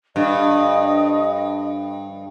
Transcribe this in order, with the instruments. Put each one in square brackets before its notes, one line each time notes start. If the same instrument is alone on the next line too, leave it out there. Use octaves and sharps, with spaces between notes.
[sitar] G2 [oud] D3 F3 D4 [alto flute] D#5